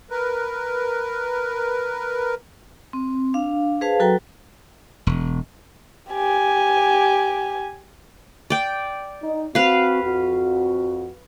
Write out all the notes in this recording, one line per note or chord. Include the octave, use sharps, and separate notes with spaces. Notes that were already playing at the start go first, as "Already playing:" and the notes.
A#4 B4
C4
D4 F5
G#4 B4 C5 F5 A5
F#3 F#4 A4 B4 G5 A#5
E1
G4 G#5
D5 G5
D#4
C4 F#4 B4 F5
F2 F#4